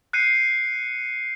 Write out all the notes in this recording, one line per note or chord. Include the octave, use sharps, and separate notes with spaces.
F#6 G6 C7 C#7 D#7